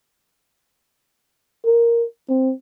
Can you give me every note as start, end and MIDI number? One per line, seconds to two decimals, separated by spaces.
1.65 2.05 70
2.29 2.53 60